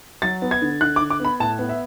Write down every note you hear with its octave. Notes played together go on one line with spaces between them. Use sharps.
F#3 A6
B3
G#6
D3
D3 F#6
D6
D3
D6
B3 B5
A2 A5
B3
E5